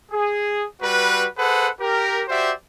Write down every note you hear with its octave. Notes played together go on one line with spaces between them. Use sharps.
G#4
G3 F#4 B4
G#4 A4 B4 C5 F#5
G4 A#4
F#4 G4 C5 D5 E5